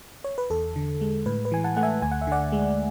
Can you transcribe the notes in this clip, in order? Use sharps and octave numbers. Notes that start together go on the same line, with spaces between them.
C#5
B4
E2 A4
D3
G#3
A2 B4
B4
E3 G#5
F#5 A5
A3 F#5
E5 G#5
D2 G#5
F#5
E5
D3 D5 F#5
G#3